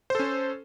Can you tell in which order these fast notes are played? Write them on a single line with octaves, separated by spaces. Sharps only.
C5 A4 C#4